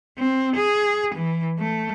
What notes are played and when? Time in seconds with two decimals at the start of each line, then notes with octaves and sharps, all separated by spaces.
0.18 C4
0.56 G#4
1.15 E3
1.59 A3